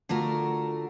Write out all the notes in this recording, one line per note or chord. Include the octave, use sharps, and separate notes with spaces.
D3 A3 F4 F#4 A#4